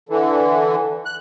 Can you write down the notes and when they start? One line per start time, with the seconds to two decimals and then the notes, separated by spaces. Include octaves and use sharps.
0.09 D3 E3
1.06 F#6